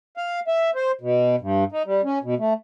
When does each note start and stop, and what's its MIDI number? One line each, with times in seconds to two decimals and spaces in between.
0.17 0.40 77
0.48 0.71 76
0.75 0.91 72
1.01 1.36 47
1.41 1.64 43
1.72 1.82 63
1.86 2.01 55
2.04 2.19 61
2.23 2.35 47
2.38 2.53 57